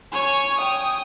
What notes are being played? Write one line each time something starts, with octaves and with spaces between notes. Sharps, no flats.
C#5 G#5
G5 D#6